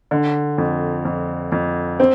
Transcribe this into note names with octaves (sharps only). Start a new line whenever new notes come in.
D3
F2
F2
F2
C4